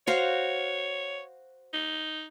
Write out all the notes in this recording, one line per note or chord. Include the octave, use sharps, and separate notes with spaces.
F#4 C5 C#5 F5
D#4